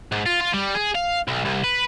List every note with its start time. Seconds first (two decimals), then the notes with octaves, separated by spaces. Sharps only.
0.12 G#2
0.26 F4
0.41 F4
0.53 G3
0.74 G#4
0.95 F5
1.28 B1
1.45 C2
1.64 B4